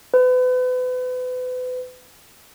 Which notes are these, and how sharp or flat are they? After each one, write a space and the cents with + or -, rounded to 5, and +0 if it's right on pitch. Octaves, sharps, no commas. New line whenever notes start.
B4 +35